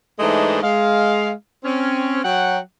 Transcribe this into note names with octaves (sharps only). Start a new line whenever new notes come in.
G#2 E3 G#3 A3 D4 D#4
G#3 F5
C4 C#4
F#3 F#5 G5